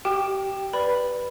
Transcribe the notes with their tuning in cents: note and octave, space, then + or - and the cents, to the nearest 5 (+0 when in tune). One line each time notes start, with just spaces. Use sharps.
G4 -25 G5 +5 D6 +40
B4 +0 D5 +0 B5 +0